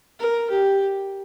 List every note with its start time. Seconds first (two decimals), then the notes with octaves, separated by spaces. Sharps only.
0.19 A#4
0.50 G4